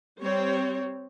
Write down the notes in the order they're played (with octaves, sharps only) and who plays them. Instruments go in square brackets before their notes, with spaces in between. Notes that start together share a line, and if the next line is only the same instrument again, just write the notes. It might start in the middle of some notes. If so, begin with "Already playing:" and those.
[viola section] G3 C4 C#5